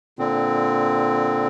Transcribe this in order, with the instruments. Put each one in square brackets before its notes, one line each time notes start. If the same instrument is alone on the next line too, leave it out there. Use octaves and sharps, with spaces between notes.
[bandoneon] A#2 D3 C4